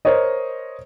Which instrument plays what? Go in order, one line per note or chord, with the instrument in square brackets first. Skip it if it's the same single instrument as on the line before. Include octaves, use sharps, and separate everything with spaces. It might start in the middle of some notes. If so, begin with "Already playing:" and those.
[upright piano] A#4 C5 C#5 D#5